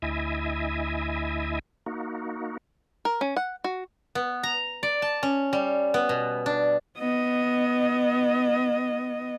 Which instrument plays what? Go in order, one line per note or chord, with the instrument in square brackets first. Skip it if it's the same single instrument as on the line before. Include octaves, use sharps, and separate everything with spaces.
[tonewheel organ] D2 E4 D#5 E5 G#5
A#3 D#4 F#4
[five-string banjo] A#4
C#4
F#5
F#4
[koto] B3
A#5
D5
A5
C#4
G3
B3
B2
D4
[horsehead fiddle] B3 D#5